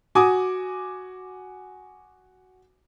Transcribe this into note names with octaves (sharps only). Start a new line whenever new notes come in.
F#4 G#5 D6 D#6